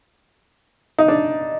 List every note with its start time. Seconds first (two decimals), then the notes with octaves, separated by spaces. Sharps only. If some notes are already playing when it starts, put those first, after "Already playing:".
0.98 D#4
1.08 D4